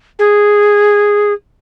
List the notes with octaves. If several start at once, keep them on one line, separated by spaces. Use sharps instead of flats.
G#4